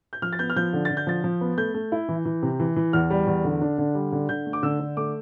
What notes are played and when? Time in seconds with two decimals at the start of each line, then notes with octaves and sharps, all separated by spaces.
0.13 G6
0.22 F3 F6
0.33 A6
0.39 B3 G6
0.50 F6
0.56 F3 G6
0.73 D3
0.85 D3 A6
0.97 G6
1.07 F3 A6
1.24 F3
1.41 B3
1.58 A3 G6
1.74 A3
1.92 E4
2.09 E3
2.25 E3
2.42 C3
2.60 E3
2.76 E3
2.93 E2 F6
3.10 G3
3.27 E2
3.44 D3
3.61 D4
3.78 D3
3.95 G3
4.12 D3
4.29 D3 G6
4.46 A3
4.53 D6
4.63 D3 E6
4.80 D3
4.97 A3 D6